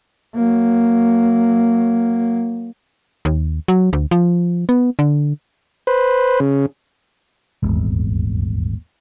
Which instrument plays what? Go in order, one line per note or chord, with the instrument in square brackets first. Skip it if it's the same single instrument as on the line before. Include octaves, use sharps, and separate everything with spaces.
[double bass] F#3 A#3
[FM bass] D#2
F#3
D2
F3
B3
D3
[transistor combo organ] B4 C5
C#3
[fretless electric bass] D#1 G#1 E2